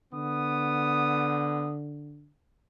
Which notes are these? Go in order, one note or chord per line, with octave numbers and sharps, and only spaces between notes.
D3 B3 D#6